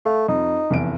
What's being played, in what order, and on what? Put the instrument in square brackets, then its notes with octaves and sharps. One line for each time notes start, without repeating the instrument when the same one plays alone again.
[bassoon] A3 [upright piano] F5
[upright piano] F2 [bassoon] D#4
[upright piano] F1 E2 D7